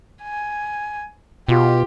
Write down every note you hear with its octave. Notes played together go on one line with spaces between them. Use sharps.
G#5
B2 F4 G4